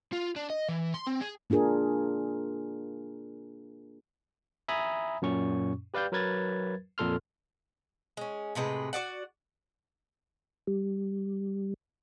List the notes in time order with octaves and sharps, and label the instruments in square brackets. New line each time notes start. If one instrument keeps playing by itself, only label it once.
[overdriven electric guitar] F4
D4
D#5
E3
C6
C4
G#4
[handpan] A#3 D4 F4 G#4 A#4
[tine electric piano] E5 G#5 A#5 B5 D#6
F#2 A#2 C#4 C#6
G4 B4 D5 F5 G5 G6
F#3 A#4 B4 G#6 A6
F2 A#2 A4 C6 F6
[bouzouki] G#3 C#4
A2 C3 G#3 B4
F#4 G#4 D5 F#5
[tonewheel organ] G3